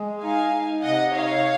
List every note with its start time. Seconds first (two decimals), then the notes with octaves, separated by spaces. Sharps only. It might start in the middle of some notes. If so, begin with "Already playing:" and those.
Already playing: G#3
0.22 D#4 F5 G#5
0.53 D#4
0.83 C3 D#5 F#5
1.14 D#4 C#5 F5